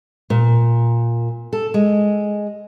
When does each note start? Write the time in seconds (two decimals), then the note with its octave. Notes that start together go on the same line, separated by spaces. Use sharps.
0.30 A#2
1.53 A4
1.74 G#3